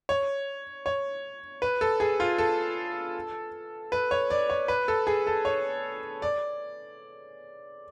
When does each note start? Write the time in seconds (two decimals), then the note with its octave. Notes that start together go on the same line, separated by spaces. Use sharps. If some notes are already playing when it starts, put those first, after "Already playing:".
0.09 C#5
0.86 C#5
1.62 B4
1.81 A4
2.00 G#4
2.20 F4
2.38 A4
3.92 B4
4.11 C#5
4.30 D5
4.50 C#5
4.68 B4
4.88 A4
5.07 G#4
5.27 A4
5.45 C#5
6.22 D5